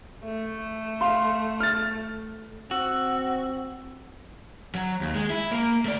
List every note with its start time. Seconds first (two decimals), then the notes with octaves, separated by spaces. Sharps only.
0.24 A3
1.01 F5 C6
1.60 F6 A6
2.71 C4 F#4 E6
4.75 F#3
5.01 D#2
5.15 G#3
5.30 E4
5.52 A#3
5.85 A3 D5